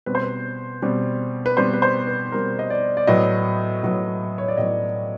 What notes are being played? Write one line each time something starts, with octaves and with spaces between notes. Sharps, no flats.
B2 G3 C4 B4
C5
B4
B2 G3 C4
B4
B2 G3 C4 C5
B4
C5
B4
B2 G3 C4 A#4
D#5
D5
D5
A2 F#3 B3 D#5
A2 F#3 B3
C#5
D5
A2 F#3 B3 D#5